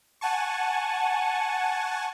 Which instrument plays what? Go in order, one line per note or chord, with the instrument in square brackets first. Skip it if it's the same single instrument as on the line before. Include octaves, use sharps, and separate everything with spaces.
[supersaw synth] F#5 G#5 A5 C#6